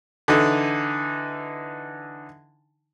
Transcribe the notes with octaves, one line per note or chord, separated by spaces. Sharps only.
D3 E3 D#4